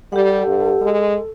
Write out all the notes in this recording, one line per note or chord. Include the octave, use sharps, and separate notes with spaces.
G3 G4 A4 F#5
G2
G#3